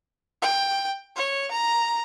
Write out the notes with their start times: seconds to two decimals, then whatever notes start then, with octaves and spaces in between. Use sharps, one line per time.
0.42 G5
1.16 C#5
1.51 A#5